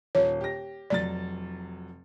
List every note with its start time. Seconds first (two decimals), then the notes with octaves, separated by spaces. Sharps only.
0.15 D#1 C#5
0.41 G4 A#6
0.90 F1 F#3 D5 A6